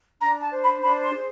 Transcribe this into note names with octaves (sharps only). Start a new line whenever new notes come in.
D4 A#5
A5
C5
B5
D4 B5
C6
G#4